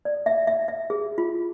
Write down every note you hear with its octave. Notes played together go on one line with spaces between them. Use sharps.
D5
E5
E5
E5
G#4
F4